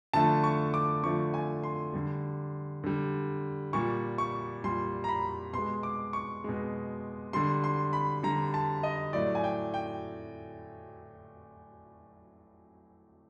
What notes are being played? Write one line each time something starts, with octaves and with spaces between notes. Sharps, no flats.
D3 F3 A3 A5
C#6
D6
D3 F3 A3 C#6
G#5
C6
D3 G3
D3 G3
A#2 G3 C#6
C#6
A#2 G3 C6
A#5
B5
B2 C6
G#3
D6
C#6
B2 G#3
D3 G3 C6
C6
B5
D3 G3 A#5
A5
D#5
A2 F#3 A3 D5
G#5
G5
G5